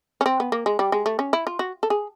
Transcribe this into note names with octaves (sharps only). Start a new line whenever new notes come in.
C#4
C4
B3
A#3
G#3
G3
G#3
A3
C#4
E4
F4
F#4
A4
G#4